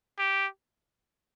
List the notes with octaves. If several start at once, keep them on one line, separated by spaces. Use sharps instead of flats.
G4